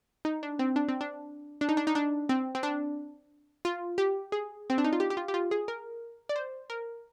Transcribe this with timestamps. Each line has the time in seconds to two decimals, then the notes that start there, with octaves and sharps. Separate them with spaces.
0.25 D#4
0.43 D4
0.59 C4
0.76 D4
0.88 C4
1.01 D4
1.61 D4
1.69 D#4
1.77 D4
1.87 D#4
1.95 D4
2.29 C4
2.55 C4
2.63 D4
3.65 F4
3.98 G4
4.32 G#4
4.70 C4
4.78 D4
4.84 D#4
4.93 F4
5.00 G4
5.10 G4
5.17 F4
5.28 G4
5.34 F4
5.51 G#4
5.68 A#4
6.29 D5
6.36 C5
6.70 A#4